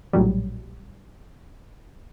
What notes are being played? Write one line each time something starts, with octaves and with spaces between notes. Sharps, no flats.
A#1 A2 F#3 G3